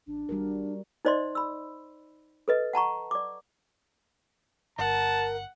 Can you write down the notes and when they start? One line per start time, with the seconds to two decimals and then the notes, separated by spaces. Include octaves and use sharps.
0.07 A1 D4
0.29 G#1 G3 F#4 A#4
1.05 D#4 C5 D5 D#5 C6
1.35 B5 E6
2.48 A4 B4 D#5
2.73 F#5 A5 A#5 C#6
3.11 D5 D6
4.79 G1 A#4 F#5 A5